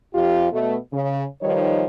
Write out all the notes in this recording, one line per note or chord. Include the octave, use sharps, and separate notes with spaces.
F2 F4 G4
B2 A3
C#3
D#3 F3 G3 D#4 B4 C#5